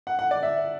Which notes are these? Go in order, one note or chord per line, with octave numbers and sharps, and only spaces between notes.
F#5
F#5
D5
E5